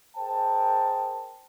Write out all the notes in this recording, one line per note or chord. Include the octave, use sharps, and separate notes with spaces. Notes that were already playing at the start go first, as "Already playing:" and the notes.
G#4 A#4 C5 G5 A5